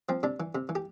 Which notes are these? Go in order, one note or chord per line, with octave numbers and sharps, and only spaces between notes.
F3 C4
C3 D4
E3
C3
E3
G4